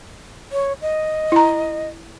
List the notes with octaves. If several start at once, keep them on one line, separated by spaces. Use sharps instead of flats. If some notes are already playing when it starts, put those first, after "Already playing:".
C#5
D#5
E4 A#5